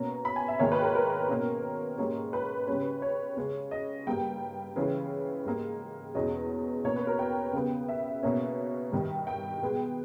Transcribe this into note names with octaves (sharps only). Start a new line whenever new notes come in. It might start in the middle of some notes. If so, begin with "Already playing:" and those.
Already playing: B2 A#3 C#4 A#5
B5
G#5
E5
G#2 D#3 A#3 C#5
B4
A#4
A#4
B2 A#3 C#4
G#2 G3 A#3 C#4
B4
C#3 G3 C#4
C#5
C#3 G#3 C#4
D#5
G2 G3 A#3 G5
C#3 E3 G#3 C#4
G#2 G3 A#3
E2 B2 G#3 C#4 D#5
B2 A#3 C#4 C#5
B4
A#4
G5
C#3 G3 B3
E5
B2 A#3 C#4
G2 D#3 G3
G5
B2 G#3 B3